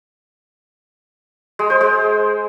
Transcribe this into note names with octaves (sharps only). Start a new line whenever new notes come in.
G#3
C5
G#3